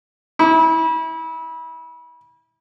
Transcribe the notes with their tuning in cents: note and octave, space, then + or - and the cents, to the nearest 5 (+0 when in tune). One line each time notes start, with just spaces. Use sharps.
E4 -30